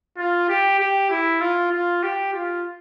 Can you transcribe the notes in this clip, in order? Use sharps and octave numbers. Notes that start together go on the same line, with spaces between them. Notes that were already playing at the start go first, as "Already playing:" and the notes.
F4
G4
G4
E4
F4
F4
G4
F4